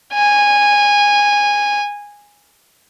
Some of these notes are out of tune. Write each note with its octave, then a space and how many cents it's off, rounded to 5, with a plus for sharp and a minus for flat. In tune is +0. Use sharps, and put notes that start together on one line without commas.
G#5 -15